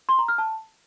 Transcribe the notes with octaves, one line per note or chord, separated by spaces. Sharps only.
C6
A#5
F6
A5